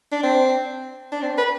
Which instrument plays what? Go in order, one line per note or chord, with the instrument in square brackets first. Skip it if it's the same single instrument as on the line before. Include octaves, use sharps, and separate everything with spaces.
[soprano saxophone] D4
C4
D4
C4
B4